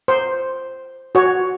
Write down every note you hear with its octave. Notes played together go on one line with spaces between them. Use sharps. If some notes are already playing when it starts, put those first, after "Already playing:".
C5
F#4 C#5